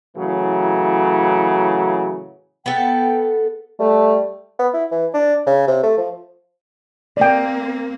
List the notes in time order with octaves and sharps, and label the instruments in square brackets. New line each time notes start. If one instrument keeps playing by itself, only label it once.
[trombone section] A2 C#3 E3 F#3
[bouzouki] B3 A4 [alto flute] G5
[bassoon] G3 [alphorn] A3
[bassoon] B3
E4
E3
D4
C#3
C3
A3
F3
[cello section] A#3 C4 [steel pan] D5 G5